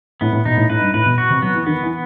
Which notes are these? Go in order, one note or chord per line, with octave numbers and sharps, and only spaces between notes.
A2 B3
A2
B2 D#4
A2
A2 B4
G2
A2 B4
B2
F#4
C3
F#3 B3
E3
D#3 B3
E3